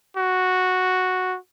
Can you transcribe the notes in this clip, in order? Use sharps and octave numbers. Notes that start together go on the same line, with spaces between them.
F#4